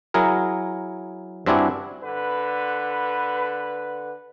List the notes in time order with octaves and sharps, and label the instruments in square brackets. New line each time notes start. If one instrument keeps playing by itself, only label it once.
[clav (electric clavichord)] F#3 E4 G#4 A#4
G2 C4 D4 E4 F#4 G#5
[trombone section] D3 B4